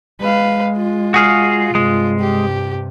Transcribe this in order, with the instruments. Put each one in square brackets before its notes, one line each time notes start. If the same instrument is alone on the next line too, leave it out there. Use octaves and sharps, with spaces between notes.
[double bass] G#3 [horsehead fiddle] B4 F5
[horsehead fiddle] F4
[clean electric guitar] F#4 G#4 F5
[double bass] G2 C3 [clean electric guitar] G#3
[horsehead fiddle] G4